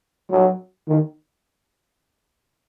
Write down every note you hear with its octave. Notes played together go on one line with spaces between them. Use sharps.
F#3
D#3